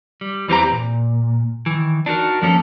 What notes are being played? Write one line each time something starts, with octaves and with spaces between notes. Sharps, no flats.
G3
E2 E3 C4 G4 A#5
A#2
D#3 E3
D4 D#4 F#4 A#4
F2 F3 A#3 C#4 A4